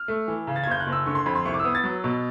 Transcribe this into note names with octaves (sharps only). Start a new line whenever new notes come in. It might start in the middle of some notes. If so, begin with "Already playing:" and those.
Already playing: F6
A3
E3
C#3
A6
G#6
F#1 G6
F#6
F#1
E6
D3 C#6
C6
F2 B5
C6
C2 C#6
D6
E6
B3 D#6
A6
F#3
B2